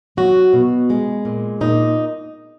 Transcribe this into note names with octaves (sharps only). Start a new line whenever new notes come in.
F#3 F#4
B2
G#3
A#2
A#2 D#4